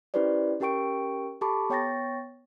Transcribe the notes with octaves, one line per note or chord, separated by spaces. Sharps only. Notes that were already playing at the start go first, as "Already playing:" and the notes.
C#4 E4 G4 B4 C5 D5
C#4 G4 A#4 G5 C#6 D7
G4 A4 A5 B5 C#6 D6
B3 C#5 G5 C#6 A6 A#6